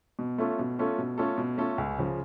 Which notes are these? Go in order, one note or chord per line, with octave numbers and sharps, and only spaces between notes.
B2
A3 C#4 F4 A4
B2
A3 C#4 F4 A4
B2
A3 C#4 F4 A4
B2
A3 C#4 F4 A4
C#2
C#3 F3